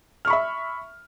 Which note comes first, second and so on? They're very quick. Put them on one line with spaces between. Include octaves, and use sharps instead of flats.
F6 C#6 B5 E5